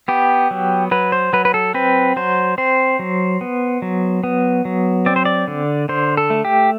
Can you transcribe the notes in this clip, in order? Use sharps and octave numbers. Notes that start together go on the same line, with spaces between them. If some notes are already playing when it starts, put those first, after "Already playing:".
B3 G4
F#3
F#3 B4
C5
F#3 B4
B4
A4
C4 B4
F#3 C5
C4 C5
F#3
B3
F#3
B3
F#3
C4 D5
C5
D5
D3
D3 C5
A4
A3
G4